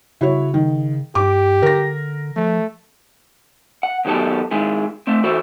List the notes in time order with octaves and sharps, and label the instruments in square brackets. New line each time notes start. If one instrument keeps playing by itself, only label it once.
[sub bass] C#3 [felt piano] E4 F#4 C#5
[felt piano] D#3
[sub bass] G2 [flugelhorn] G4 [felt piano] D6
[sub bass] D3 [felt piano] A#4 A#6
[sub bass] F3 [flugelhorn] A3
[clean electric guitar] F#5
D#2 D#3 F#3 B3 G4 A4
D#3 G#3 E4 G#4
A3 C4
E3 E4 F#4 A4 C5